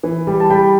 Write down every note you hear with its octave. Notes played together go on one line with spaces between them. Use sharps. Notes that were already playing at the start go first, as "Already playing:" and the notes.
E3
G3
A5
G3 G5 B5